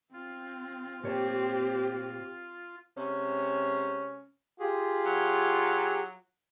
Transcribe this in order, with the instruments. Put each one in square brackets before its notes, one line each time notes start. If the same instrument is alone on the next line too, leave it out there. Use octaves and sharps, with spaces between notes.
[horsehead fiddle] C4 [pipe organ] F4
[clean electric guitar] A#2 C#5 A5 [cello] C4 [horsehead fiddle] G4
[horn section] C3 G#3 C#4
[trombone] F4 [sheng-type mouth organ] G4 G#4
[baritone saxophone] F#3